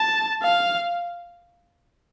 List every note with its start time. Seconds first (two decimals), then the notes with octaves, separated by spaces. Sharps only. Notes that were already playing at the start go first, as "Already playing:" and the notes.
Already playing: A5
0.42 F5